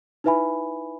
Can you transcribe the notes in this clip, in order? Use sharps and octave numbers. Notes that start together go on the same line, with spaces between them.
D#4 E4 B4 E5 G#5 B5